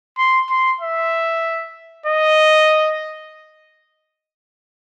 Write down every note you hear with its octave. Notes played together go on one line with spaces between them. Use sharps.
C6
C6
E5
D#5